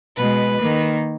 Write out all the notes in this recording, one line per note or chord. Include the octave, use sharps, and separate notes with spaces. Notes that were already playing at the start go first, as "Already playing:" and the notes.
B2 G#3 B4
D#3 A#3